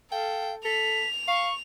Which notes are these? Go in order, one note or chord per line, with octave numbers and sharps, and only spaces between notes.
A4 F5 G5
A4 B6 F7
F5 C#6